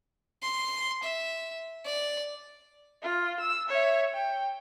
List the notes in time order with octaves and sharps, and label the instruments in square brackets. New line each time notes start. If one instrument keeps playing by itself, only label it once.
[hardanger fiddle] C6
E5
D5
[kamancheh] F4
E6
C#5 E5
G5